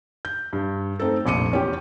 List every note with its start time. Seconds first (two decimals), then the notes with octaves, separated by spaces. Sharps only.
0.25 G6
0.53 G2
0.99 A3 C4 D#4 A4
1.25 F1 A#1 D6 C#7 D#7
1.51 E2 C#4 G4